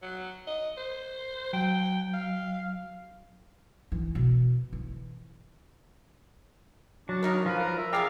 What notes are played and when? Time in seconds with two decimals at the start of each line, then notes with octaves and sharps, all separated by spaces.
0.02 F#3
0.47 D#5
0.77 C5
1.53 F#3 G5
2.13 F5
3.92 E3
4.15 B2
4.73 E3
7.09 F#3 D4
7.23 G2 D#4 A#4 C#5
7.46 F3 B4 F5
7.59 A#4
7.78 E5
7.93 E2 G#4 A#4 D5 F5 G5